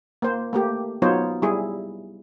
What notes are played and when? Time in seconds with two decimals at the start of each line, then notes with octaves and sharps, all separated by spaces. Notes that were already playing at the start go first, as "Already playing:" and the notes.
0.22 A#3 C5
0.53 A3 A#3 G4
1.02 F#3 B3 D#4 F4 C5 C#5
1.42 G3 E4 G#4